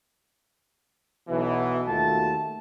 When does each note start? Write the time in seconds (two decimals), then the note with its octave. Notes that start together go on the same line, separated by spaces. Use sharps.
1.29 B1 B2 E3
1.87 D#2 A3 F4 F#4 A5